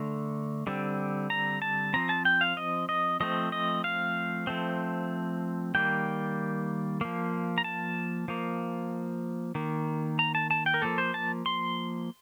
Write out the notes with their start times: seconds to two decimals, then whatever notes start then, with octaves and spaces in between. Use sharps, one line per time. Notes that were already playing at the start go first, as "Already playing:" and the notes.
Already playing: D3 A3 A#5
0.67 D3 G3 C4
1.30 A#5
1.62 A5
1.94 F3 C4 A#5
2.09 A5
2.25 G5
2.41 F5
2.57 D#5
2.89 D#5
3.20 F3 A3 C4 D#5
3.52 D#5
3.84 F5
4.47 F3 A3 C4
5.75 D#3 G3 A#3 G5
7.01 F3 A#3
7.58 A#5
7.64 A5
8.28 F3 A#3
9.55 D#3 A#3
10.19 A#5
10.35 A5
10.51 A5
10.66 G5
10.74 A#4
10.82 F3 A#3 A4
10.98 C5
11.14 A5
11.46 C6